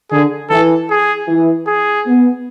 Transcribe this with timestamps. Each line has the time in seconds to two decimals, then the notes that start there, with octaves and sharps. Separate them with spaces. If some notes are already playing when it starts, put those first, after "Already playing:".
0.11 D3 G#4
0.50 E3 A4
0.90 G#4
1.28 E3
1.67 G#4
2.06 B3